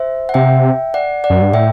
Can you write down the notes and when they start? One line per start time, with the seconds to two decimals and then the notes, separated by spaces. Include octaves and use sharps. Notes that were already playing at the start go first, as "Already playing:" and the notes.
Already playing: C5 E5
0.29 F#5
0.34 C3 E5 G5
0.94 D5 F#5
1.24 D5 F#5
1.30 F#2
1.41 G2
1.53 A2 E5 G5